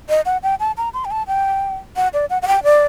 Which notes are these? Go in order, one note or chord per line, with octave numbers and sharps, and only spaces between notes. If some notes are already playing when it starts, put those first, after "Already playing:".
D#5
F#5
G5
A5
A#5
C6
G5
A5
G5
F#5
D5
F#5
F#5
G5
D5